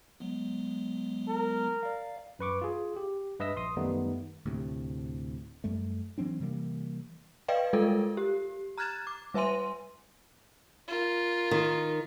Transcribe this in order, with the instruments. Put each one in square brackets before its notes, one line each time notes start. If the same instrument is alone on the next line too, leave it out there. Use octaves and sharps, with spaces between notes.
[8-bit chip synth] F#3 G#3 B3
[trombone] A#4
[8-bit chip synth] D5 F5
[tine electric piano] F#2 B4 C#6 D6
F4 G#4
G4
G2 B4 D#5 E5 E6 A#6
A#1 C6 D#6
F#2 D#3 G3 A3 B3 D#4
[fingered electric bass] D2 A2 C3
F#2 G3 A3
E3 F#3 C4 D4
C3 E3 G3 A#3
[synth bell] B4 D5 D#5 F5 G5
G3 G#3 F4 A4 A#4
G4
A#5 F6 F#6 G#6 A6 E7
D6
G3 B4 E5 G#5 C6 D#7
[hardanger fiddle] F4 A#4
[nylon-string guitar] D#3